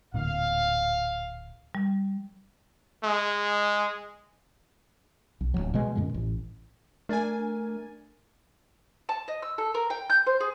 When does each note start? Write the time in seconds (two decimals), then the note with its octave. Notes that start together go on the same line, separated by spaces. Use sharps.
0.14 D1 A#2 D3 F5
1.75 G3
3.03 G#3
5.41 B1
5.54 D1 C#2 F#3
5.74 B2 G#3
5.95 F#2 A#2 D3 G#3
6.14 A1
7.09 A3 D4 A#4 G#5 A6
9.09 A5
9.28 D#5
9.42 E6
9.58 A4
9.74 A#4
9.90 G5
10.10 G6
10.27 C5
10.41 G#4